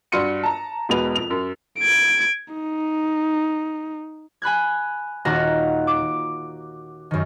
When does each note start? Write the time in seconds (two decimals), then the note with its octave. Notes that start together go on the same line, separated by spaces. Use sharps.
0.12 G2 F#4 C6 C#7 D#7
0.43 A5 A#5
0.89 E1 B2 G#3 F#4 B4 F7
1.16 F2 F7
1.30 F#2
1.79 G#6 D7
2.54 D#4
4.42 G#5 B5 F#6 G#6
5.25 D#1 D#3 F#4 F5 F#5 A#5
5.87 D6
7.11 F#2 D#3